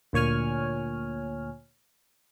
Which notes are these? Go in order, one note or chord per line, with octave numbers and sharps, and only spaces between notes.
D2 A#2 C#5 G#5 F6